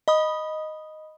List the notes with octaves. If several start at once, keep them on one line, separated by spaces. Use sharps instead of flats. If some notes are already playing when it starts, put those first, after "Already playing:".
D#5 B5 D#6